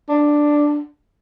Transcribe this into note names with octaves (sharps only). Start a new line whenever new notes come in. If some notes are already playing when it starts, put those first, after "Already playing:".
D4